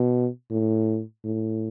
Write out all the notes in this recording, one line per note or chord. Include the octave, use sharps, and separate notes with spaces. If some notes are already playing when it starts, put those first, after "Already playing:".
Already playing: B2
A2
A2